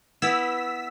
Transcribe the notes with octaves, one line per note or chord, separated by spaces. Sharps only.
B3 E4 E6 B6